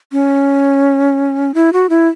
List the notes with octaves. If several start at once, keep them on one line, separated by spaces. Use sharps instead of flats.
C#4
E4
F#4
E4